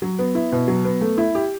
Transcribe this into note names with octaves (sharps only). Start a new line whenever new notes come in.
F#3
B3
E4
B2
F#3
B3
A3
E4
G4